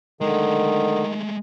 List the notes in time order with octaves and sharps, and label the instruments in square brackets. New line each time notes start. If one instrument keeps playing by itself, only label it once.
[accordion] D3 [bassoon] D#3 [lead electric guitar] G#3 A3